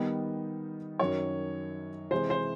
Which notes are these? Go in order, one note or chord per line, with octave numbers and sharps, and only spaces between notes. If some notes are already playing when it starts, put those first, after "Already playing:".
Already playing: D#3 G3 B3 D#4
F#2 D#3 F#3 C#5
C3 E3 G#3 C5
C5